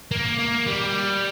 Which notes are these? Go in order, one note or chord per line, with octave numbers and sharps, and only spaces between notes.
A#3
A#3
G3